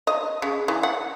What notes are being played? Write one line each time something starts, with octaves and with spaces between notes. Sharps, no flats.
D#5
C#3
E3
F#5